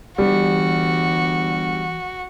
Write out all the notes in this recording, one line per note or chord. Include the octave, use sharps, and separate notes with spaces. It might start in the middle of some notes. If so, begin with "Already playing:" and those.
G1 E3 G3 F#4